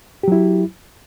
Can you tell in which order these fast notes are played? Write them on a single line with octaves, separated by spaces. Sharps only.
G4 F#3 E4